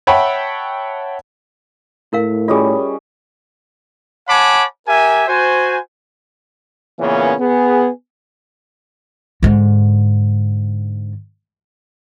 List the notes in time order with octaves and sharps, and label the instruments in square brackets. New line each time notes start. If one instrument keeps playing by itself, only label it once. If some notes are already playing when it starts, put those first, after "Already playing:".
[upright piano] C#5 E5 F#5 G5 A5 B5
[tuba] A2 [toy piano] E4 A#4 F5
[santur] G3 C#4 D#5 [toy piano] F4 G#4
[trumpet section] C#5 F#5 G#5 A5 B5 D6
G4 A#4 E5 G#5
F#4 C5 G#5
[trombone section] A#2 C#3 E3 A#3 B3 C#4
B3 G#4
[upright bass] G#2 D3